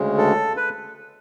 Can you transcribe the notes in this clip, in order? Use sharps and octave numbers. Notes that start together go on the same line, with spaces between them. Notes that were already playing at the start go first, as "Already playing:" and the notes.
Already playing: D2 C#3 G#3
A4
B4